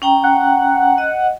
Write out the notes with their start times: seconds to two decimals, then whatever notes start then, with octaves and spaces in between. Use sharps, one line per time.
0.02 C#4 G5 A#5
0.24 F#5
0.98 D#5